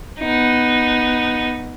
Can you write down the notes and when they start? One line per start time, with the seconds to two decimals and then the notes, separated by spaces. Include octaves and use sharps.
0.20 B3 D#4